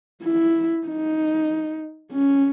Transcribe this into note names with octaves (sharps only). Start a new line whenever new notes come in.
E4
D#4
C#4